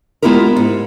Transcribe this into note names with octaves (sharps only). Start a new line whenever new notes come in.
G#3 B3 E4 F4 G4 A#4
G#2